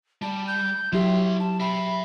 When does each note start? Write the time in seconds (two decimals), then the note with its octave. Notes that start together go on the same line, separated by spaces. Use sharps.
0.22 G3 A5
0.47 G6
0.93 F#3 E4 G4 E5 C6
1.40 A5
1.60 E5 G5 B5